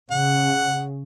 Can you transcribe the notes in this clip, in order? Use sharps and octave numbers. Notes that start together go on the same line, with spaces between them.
C#3 F#5